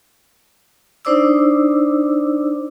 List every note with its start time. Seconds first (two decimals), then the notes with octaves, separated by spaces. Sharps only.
1.05 D4 D#4 C5 D5 D6 E6